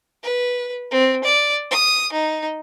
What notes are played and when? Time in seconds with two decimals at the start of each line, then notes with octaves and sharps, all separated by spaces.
0.23 B4
0.91 C4
1.24 D5
1.71 D#6
2.13 D#4